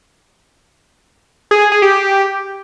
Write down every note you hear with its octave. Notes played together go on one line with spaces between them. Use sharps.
G#4
G#4
G#4
G4